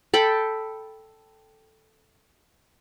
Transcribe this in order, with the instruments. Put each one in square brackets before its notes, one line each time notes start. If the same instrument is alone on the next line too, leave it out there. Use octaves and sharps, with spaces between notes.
[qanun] A4 G5 B5